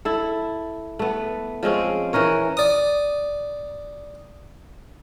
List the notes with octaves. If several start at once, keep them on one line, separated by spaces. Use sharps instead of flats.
E4 A4
A3 B3
F3 G#3 C4 C#4
E3 C#4 A#4 C#5
D5 D#6